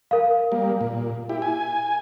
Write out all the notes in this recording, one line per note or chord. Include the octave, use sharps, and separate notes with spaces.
A#4 F5
G3 A#3
A#2
E4 G4
G#5